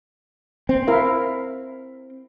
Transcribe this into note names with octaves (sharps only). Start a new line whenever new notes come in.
C4
E4 A#4 F5